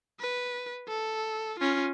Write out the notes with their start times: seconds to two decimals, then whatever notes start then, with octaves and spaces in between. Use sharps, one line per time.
0.20 B4
0.88 A4
1.59 C#4 F4